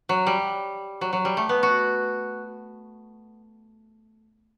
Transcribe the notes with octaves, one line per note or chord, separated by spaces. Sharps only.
F#3
G3
F#3
F#3
G3
A3
B3
F#4